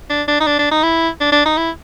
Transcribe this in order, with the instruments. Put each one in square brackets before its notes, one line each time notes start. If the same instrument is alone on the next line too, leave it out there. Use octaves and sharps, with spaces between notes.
[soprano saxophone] D4
D4
D#4
D4
D4
D#4
E4
D4
D4
D#4
E4